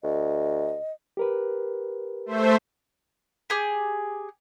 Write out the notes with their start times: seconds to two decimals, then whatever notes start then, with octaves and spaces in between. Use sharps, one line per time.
0.04 D2 D#5
1.17 G4 A#4 B4
2.26 A3 C5 E5
3.50 G4 G#4